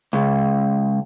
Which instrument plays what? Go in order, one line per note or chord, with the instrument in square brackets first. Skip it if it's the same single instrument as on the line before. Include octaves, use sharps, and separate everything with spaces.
[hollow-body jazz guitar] C#2